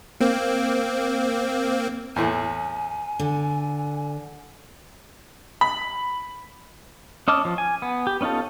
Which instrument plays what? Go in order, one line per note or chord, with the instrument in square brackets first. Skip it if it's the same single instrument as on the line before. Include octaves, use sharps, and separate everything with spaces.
[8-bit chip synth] A#3 C4
[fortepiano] E2 A2 [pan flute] G#5
[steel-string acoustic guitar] D3
[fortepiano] B5
[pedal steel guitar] C#4 D#5 A5 D6 F6
F3
G#5
B3
G4
B3 C#4 D#4 F4 A4